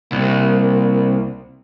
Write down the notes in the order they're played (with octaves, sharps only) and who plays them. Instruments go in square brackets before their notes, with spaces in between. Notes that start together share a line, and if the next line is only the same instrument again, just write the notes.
[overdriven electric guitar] C2 [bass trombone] A#3